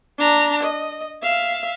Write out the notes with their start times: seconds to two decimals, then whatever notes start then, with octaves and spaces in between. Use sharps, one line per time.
0.19 D4 A#5
0.63 D#5
1.22 E5 F5